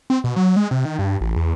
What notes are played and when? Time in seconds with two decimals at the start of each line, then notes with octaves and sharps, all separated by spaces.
0.10 C4
0.24 B2
0.36 F#3
0.56 G#3
0.71 C3
0.85 D#3
0.99 G2
1.21 A1
1.36 E2